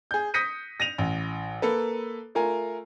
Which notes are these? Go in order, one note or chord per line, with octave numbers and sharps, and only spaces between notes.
G#4 G6
D#6 G6 A#6 B6 C#7 D#7
A#6 D#7 F7
A1
A#3 A4 B4
A3 F4 A#4 G#5